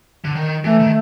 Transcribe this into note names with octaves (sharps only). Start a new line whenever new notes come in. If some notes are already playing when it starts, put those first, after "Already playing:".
D3
D#3
E3 A3
D#3